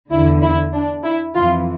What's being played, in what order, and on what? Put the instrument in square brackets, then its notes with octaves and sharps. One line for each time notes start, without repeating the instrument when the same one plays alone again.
[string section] E2 D3 E4
E4
D4
E4
F2 E3 F4